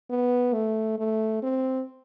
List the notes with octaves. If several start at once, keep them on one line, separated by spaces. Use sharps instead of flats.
B3
A3
A3
C4